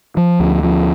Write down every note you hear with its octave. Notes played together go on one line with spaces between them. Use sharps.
F3
D2
F3